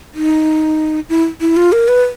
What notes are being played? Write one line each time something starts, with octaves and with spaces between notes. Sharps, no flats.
D#4
E4
E4
F4
A#4
B4